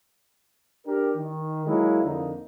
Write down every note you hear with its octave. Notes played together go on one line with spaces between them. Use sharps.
D4 G4 A#4
D#3
F#3 G#3 A#3 E4
F2 D3 A#3 D#4